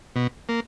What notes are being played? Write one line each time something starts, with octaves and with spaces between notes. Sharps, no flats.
B2
A#3